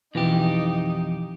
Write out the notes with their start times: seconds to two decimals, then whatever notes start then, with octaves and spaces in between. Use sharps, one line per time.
0.15 F2 B2 E3 D#4 G4